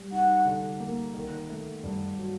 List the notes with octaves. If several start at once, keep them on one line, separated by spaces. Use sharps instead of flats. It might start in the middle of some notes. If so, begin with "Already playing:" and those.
Already playing: G3
D#4 F#5
D3
A#3
D#3
A3
G2
F#3